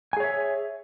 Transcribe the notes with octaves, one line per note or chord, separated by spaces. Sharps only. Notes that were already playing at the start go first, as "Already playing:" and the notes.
G#4 C#5 E5 G#5